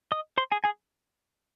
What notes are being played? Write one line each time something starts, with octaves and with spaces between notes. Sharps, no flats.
D#5 D#6
C5 C6
G#4 G#5
G#4 G#5